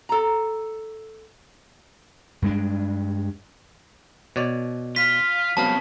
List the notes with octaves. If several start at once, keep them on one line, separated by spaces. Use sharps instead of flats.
A4 A#5
G2 G#3 D4
B2 C#5 D5
F4 B6
C2 C#3 F#3 B3 F5 A5